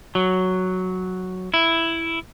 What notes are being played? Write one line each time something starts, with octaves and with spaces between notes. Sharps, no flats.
F#3
E4